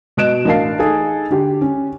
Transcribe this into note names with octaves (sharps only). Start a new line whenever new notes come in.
B2 D#5 F#6 D7 E7
A1 D4 A#4 F5 A5 C7
D#4 G#4 A4
D3 G4
C#4